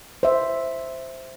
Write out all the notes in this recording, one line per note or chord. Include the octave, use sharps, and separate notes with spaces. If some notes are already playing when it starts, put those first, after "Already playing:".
C5 E5